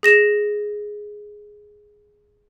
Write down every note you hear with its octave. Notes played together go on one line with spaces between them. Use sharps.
G#4 A#6 E7